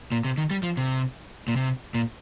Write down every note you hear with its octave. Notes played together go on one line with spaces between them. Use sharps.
A#2
C3
D#3
G3
F3
C3
A#2
C3
A#2